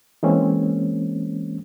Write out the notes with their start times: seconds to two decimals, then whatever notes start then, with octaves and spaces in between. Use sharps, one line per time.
0.23 E3 G#3 A#3 C4 C#4